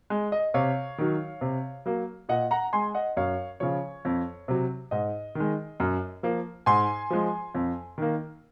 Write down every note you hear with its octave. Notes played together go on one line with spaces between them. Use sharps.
G#3
D#5
C3 C#5 F5
D#3 F#3
C3
F#3 A#3
A#2 D#5 F#5
F#5 A#5
G#3 G#5 C6
D#5 F#5
F#2 C#5 F5
C#3 F3 C#5
F2
C3 F#3
G#2 D#5
D#3 G#3
F#2
F3 A#3
G#2 G#5 C6
F3 G#3
F2
D#3 A#3